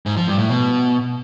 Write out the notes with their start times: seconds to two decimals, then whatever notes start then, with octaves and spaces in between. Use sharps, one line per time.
0.06 G#2
0.17 F3
0.28 G2
0.38 A2
0.49 B2